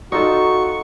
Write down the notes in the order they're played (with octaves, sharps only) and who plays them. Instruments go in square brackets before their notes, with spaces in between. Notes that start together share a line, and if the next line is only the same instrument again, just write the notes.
[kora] D#4 F4 A4 [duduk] F#4 [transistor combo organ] C#6